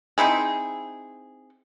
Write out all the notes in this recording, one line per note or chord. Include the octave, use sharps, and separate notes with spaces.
C4 D#4 E4 G#4